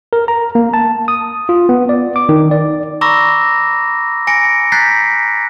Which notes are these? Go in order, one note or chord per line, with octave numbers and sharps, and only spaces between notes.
A#4
A#5
A#3
A5
D#6
F4
B3
D5
D6
D#3
D5
A#5 B5 C#6 D6 E6 A#6
G#5 A#6 C#7 D7
A#5 F#6 G6 A6 B6 C7